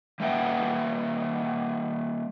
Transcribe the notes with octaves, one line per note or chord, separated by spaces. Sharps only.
G3 A#3 B4 E5 F#5 G5